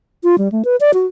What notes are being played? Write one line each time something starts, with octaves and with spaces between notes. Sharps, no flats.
F4
G3
A3
B4
D5
F#4